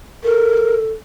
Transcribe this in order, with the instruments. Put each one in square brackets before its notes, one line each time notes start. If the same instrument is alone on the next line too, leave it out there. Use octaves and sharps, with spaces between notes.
[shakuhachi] A4 [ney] A#4